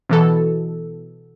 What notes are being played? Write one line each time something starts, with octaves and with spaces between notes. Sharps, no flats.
B2 E3 A4